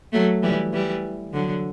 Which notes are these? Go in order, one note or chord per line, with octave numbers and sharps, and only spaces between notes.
F#3 A3
E3 G3
E3 G3
D3 F#3